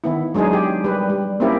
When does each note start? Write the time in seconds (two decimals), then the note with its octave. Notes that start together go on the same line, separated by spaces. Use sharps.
0.04 D#3 B3 E4
0.35 F#3 G#3 D4 D#4 G#4
0.53 G4
0.84 G3 B4
1.10 G3
1.40 A#3 C4 C#4 E4 G4 A#4